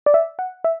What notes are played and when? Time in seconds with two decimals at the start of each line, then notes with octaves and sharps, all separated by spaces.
0.06 D5
0.14 E5
0.39 F#5
0.64 E5